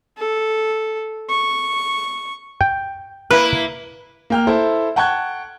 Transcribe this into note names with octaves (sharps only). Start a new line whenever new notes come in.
A4
C#6
G5
A#3 E4 B4
A#3 G5 F6
E4 A4 C5
F#5 G5 A5 C#6 F#6 G#6